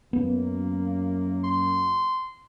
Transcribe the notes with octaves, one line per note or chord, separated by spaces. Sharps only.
F#2 A#3 B3
C6